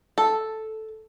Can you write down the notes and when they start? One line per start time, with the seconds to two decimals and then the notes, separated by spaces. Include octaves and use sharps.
0.18 A4